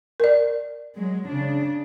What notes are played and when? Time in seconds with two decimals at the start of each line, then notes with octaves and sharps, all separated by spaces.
0.20 A#4 D5
0.94 F#3 G#3
1.26 C#3 D4